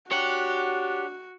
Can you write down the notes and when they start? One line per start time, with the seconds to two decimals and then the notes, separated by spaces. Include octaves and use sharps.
0.11 D4 F#4 G4 C#5 F#5